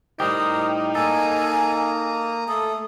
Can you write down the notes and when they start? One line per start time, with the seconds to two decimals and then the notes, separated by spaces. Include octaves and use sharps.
0.20 A2 G3 D#4 G4 A#4 C5 D#6
0.95 A#3 A4 G#5 A#5 D#6
2.48 A3 A4 D#6